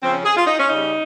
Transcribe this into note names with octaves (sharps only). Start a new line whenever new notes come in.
C#3 F3 C4
C#4
G#4
F4
D#4
C#4
C#3 G3 D#4